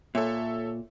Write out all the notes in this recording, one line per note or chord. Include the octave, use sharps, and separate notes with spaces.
A#2 A4 C#5 E5